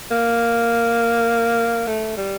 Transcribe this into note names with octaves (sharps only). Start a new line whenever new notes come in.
A#3
A3
G3